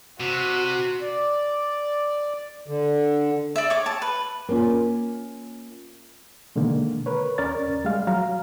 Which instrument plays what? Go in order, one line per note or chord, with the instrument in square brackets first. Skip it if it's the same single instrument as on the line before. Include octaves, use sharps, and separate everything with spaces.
[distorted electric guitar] C3 [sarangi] F#4
[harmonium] D5
D3
[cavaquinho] D5 E5
C#5 D6
A5
B4
[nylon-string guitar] A#3 C#4 F4
[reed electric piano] B2 D3 D#3 G#3 A#3
A#4 B4 C#5
D#2 C#4 A#4 C#5 D5 A6
G3 G#3 F5
F#3 F5 A#5